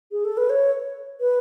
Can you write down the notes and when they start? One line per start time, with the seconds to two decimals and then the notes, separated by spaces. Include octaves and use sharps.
0.12 G#4
0.24 A4
0.37 B4
0.50 C#5
1.20 B4